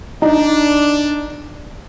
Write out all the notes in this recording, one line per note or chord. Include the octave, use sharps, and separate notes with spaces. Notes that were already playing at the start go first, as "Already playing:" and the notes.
D4 D#4